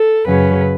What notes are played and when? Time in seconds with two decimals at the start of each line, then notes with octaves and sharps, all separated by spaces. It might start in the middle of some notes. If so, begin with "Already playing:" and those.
Already playing: A4
0.25 F#2 C#3 F#3 C#4 B4